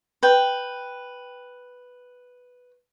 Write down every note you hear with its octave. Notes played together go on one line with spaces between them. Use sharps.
B4 G5